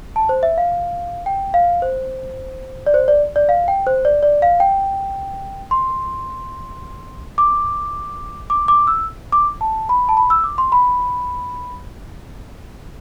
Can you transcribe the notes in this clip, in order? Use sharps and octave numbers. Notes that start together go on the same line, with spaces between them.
A5
C5
E5
F5
G5
F5
C5
D5
C5
D5
D5
F5
G5
C5
D5
D5
F5
G5
C6
D6
D6
D6
E6
D6
A5
B5
A5
B5
E6
D6
C6
B5